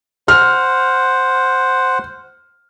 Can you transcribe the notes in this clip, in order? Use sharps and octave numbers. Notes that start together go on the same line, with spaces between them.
C5 F#5 F6